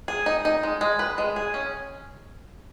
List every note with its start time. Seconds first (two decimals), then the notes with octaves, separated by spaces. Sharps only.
0.08 G#4
0.26 D#4
0.45 D#4
0.63 G#3
0.81 G#3
0.99 B4
1.18 G#3
1.36 G#4
1.54 C#4